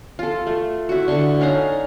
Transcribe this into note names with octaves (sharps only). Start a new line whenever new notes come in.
F4 A4
A3
E4 F#4
D3 C#6
C#4 D#4 F5 A#5